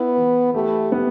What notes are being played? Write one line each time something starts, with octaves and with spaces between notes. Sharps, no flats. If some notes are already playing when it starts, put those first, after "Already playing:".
Already playing: B3 E4
E3
A3 G4
B3